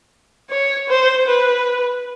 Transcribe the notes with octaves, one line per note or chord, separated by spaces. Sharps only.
C#5
C5
B4